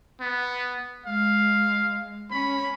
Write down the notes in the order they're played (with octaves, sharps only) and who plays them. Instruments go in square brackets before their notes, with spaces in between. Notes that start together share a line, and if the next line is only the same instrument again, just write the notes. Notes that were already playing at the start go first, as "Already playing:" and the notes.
[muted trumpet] B3
[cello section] G#3 [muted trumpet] F5
[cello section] C#4 [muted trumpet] B5